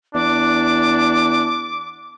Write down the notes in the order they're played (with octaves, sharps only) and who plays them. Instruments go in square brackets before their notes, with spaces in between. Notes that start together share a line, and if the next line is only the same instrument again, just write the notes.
[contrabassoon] E2 [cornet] D4 [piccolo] D6